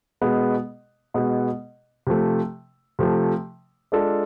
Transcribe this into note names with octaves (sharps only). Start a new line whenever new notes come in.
B2 G#3 B3
B2 G#3 B3
C3 F3 A3
C3 F3 A3
G#3 D4 F4 A4